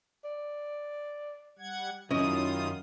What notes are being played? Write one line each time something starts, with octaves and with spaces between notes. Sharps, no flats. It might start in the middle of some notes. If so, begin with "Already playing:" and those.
D5
G3 F#5 G#6
C2 F#2 D#3 C#4 E4 F4 D#5 D#6